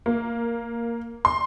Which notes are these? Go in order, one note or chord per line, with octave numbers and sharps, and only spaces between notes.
A#3
C6